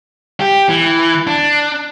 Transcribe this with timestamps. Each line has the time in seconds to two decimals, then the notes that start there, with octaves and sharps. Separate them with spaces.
0.40 G4
0.69 E3
1.27 D4